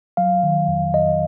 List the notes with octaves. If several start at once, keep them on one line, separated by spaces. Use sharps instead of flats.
F#3 F5
D#3
F2
F2 D#5